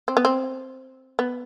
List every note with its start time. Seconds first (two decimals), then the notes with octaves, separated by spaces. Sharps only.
0.08 C4
0.17 B3
0.25 C4
1.19 B3